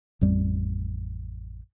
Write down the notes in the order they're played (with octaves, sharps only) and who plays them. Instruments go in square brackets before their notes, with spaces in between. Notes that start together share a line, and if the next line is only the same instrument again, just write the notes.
[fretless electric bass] A1 F2 G3